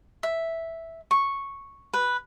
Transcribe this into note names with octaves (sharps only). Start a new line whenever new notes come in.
E5
C#6
B4